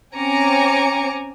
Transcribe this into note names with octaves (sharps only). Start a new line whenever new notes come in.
C4 C#4 G#5 A#5 D6 C#7